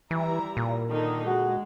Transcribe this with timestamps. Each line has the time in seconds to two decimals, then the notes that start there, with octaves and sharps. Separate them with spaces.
0.11 E3 G3 E4 A#5
0.57 A#2
0.91 D3 D#3 D#4
1.27 G#3 F#4